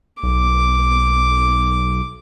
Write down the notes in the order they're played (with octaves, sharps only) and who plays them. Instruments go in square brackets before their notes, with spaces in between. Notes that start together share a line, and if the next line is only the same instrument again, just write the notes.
[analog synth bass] B1 [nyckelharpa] D6